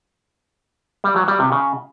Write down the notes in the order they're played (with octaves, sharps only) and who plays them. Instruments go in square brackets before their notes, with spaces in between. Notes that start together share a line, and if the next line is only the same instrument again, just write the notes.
[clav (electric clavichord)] G3
F#3
G3
C3
C#3